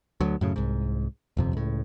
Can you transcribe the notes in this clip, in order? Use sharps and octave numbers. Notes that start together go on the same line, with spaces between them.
D2 F#3
F#2 A2 C#3
C2 G#2
D#1 F2 C3
C#2 A2